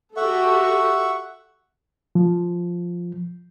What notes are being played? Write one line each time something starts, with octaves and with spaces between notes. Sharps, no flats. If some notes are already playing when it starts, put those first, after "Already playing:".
F#4 G4 A4 E5 F#5 C#6
F3